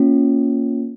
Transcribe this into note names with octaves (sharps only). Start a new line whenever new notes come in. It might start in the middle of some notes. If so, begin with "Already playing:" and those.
Already playing: A#3 C#4 F4